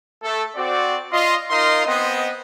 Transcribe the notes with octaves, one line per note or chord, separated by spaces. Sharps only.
A3 A4
C4 F#4 D5
F4 D#5 C6
D#4 F4 A#4 D#5 F5 C6
B3 C4 D#5